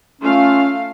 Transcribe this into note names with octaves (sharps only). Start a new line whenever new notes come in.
A3 C#4 F4 F5